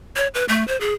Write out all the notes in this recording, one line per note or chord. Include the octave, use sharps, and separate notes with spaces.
C#5
B4
A3
C5
G#4